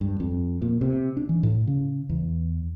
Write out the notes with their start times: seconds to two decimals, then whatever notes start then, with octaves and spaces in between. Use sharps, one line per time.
0.01 G2
0.20 F2
0.62 A#2
0.81 C3
1.17 D4
1.29 E3
1.43 A2
1.67 C#3
2.09 E2